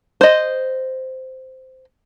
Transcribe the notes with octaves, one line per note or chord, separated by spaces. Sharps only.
C5 D#5